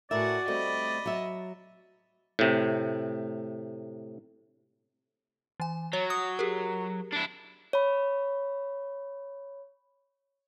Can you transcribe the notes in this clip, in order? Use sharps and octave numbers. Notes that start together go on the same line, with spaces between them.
A2 F#4 A#4 D5 E5 F#5 G#5
G3 A3 C4 D#5 B5
F#3 E5
A2 C3
E3 G#5
F#3 C#5
D#6
G4 G#4 A#4
D4 E4
C#5 B5